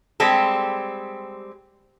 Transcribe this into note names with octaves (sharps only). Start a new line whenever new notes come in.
G3 G#3 C4 G4 A4